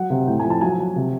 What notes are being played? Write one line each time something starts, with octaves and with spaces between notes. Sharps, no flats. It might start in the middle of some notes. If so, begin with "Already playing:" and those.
Already playing: F#3 F#5
C3
A2 G5
G#5
F3
A5
F#3 G#5
F#3
C3